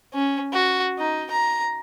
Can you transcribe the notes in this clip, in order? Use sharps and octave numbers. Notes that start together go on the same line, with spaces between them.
C#4
F#4
D#4
A#5